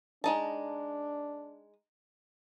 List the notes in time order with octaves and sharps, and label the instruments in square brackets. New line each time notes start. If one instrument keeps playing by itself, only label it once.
[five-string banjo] G#3 D#4 A5 [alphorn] D4